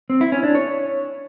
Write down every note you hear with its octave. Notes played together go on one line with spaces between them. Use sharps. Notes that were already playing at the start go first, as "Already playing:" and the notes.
C4
E4
C#4
D4
C#5